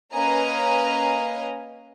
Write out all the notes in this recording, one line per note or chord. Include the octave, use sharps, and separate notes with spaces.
A#3 C#4 B4 D#5 G#5 A#5